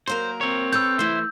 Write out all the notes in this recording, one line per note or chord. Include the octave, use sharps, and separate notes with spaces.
F#3 A#3 A#4 C5
C4 C#5
A4 B4 E6 G6
E3 A3 E4 C5